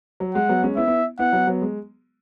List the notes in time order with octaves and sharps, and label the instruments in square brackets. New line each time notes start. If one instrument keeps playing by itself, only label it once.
[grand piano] F#3
[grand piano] G#3 [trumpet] F#5
[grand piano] F#3 B3
G#3 C#4
[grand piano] B3 E4 [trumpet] E5
[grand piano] B3 E4
[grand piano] B3 E4 [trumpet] F#5
[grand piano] F#3 B3
F#3 B3
G#3